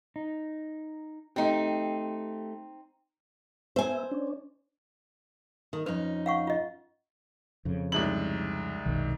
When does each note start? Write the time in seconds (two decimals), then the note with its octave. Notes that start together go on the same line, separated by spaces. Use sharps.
0.16 D#4
1.36 A3 C4 D#4 G4
3.76 B3 C5 E5 G#5
4.11 C#4 D4
5.73 D#3
5.86 F2 C#4 D#4 B4
6.26 F5 F#5 C#6
6.47 F4 D#5
7.65 F2 C#3
7.92 C2 G#2 F#7
8.85 F1 B1 D#3